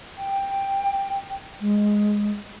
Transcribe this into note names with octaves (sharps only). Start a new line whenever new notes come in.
G5
G#3